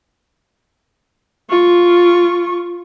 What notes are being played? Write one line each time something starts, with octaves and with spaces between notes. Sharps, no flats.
F4 C#6